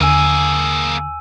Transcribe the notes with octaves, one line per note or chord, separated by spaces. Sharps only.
D#2 D3 A#3 G#4 G#5 E6 D#7